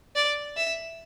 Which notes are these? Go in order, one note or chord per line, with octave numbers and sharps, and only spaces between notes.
D5
E5